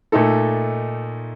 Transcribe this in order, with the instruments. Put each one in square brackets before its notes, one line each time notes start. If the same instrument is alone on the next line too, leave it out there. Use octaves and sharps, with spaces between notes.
[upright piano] A#2 A3 D#4 A4